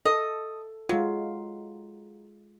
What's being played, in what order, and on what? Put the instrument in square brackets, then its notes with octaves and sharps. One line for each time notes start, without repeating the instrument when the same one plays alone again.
[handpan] A4 [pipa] D#5
[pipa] F#3 [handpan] G#3 F4